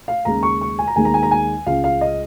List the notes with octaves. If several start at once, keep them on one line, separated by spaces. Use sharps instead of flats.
F5
D#2 C#3 G#3 A#5
C#6
C#6
G#5
A#5
D#2 D#3 G#3 G#5
A#5
G#5
A#5
G#5
C#2 C#3 G#3 F5
F5
D#5